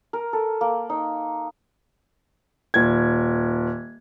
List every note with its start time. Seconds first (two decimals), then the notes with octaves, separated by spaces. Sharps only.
0.13 A#4
0.33 A4
0.61 A#3
0.90 D#4
2.74 D#1 G#6